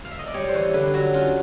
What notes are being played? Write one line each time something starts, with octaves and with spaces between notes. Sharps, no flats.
F5
E5
D#5
D5
G3 C#5
C5
E3 C#5
D3 B4
F#3 F#4
C#4 F4